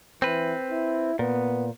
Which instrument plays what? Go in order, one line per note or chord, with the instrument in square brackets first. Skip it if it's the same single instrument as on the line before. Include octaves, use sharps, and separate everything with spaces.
[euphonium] E3 [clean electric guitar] C4 B4
[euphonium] E4
[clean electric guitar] A#2 [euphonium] B3